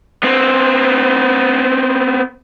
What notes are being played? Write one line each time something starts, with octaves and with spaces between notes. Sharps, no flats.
B3 C4